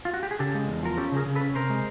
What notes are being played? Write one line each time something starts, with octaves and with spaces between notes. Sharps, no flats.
F4
F#4
G4
G#4
C#3 G4 A4
G#3
E2
F3 A#4
C#4 G4 A4
C#3 G#4 A#4
C#3
A4 B4
C#4
C3 A#4 C5
G#3